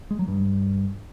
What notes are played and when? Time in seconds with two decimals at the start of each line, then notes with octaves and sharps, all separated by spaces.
0.11 G#3
0.19 F#3
0.28 G2